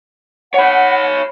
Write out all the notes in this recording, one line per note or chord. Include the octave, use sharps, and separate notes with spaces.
C#5 F#5 B5